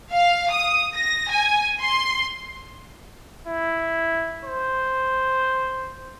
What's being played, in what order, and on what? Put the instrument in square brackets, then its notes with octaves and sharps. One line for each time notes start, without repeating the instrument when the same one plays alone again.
[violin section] F5
D#6
A#6
G#5
C6
[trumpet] E4
C5